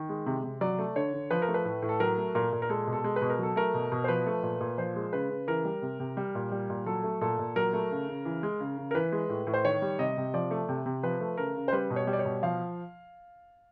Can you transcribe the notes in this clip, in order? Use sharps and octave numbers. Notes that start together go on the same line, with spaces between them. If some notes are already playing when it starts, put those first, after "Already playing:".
Already playing: D#3
G#3
C3
C3
F#3 D5
A3
D3 C#5
D3
F3 B4
A#4
A3
B4
A2
A2
A4
F#3 A#4
A3
A#2 A#4
A#2
A#4
G#3 A4
B2
A4
G#3
B4
B2
A#4
F#3 A4
A3 A#4
B2
B2
C5
F3 B4
A3
A#2
A#2
F3 C5
G#3
C#3 B4
C#3
E3 A#4
G3
C3
C3
G3
A#2
G3
A#2
F#3 A4
A3
A#2 A4
A#2
F#3 A#4
A3
C#3
C#3
E3
G#3
C#3
C#3
A#4
E3 B4
G#3
A2
A2
C5
D#3 C#5
G3
C3 D#5
C3
F3 D5
A3
C3
C3
F3 B4
A3
C#3 A#4
C#3
C5
G3 B4
B2
C#5
G3
D5
C#5
B2
F3 F5